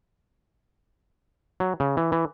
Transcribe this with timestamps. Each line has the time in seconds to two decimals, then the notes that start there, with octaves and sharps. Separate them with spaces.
1.60 F#3
1.80 C#3
1.97 E3
2.12 E3